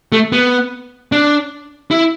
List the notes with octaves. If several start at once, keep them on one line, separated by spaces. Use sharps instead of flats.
A3
B3
D4
E4